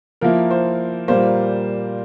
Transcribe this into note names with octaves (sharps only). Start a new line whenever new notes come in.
F3 A#3 E4 A#4
C5
A#2 G3 A#3 C5